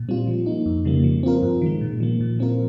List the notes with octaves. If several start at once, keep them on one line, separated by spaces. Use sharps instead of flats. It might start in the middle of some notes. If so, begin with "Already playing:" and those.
Already playing: A#2
G3 C4 F4
F3
A#3 D#4
F2
C#3 G3 A#3
F3
C4 F4 A#4
G2
D#3 G#3
A#2
F3 A#3
A#2
F3 C4 F4 A#4